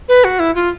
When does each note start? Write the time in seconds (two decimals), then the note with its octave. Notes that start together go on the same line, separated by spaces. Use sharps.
0.09 B4
0.24 F#4
0.39 E4
0.55 F4